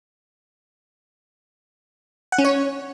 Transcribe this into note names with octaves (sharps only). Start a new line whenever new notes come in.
F#5
C#4
C#5